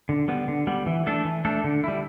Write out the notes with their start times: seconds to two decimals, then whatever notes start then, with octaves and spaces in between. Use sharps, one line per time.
0.09 D3
0.28 G3 B3
0.48 D3
0.67 G3 B3
0.86 E3
1.06 A3 D4 A4
1.25 E3
1.45 A3 D4 A4
1.64 D3
1.84 G3 E4